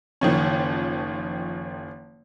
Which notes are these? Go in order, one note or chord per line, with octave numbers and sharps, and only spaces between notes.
F#1 D#3 F3 C#4